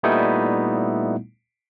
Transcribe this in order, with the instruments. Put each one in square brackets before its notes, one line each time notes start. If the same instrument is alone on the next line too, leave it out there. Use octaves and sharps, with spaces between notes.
[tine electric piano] A#2 G3 A3 B3 D#4 E4